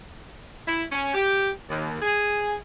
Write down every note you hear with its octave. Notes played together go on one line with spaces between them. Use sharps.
E4
C#4
G4
D#2
G#4